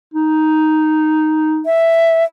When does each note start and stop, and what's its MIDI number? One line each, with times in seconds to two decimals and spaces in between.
0.14 1.64 63
1.66 2.24 76